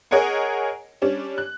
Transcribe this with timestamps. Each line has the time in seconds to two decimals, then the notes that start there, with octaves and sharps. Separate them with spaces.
0.11 G#4 A#4 C#5 D#5 F#5 G#5
1.02 G3 C#4 D4
1.38 F#6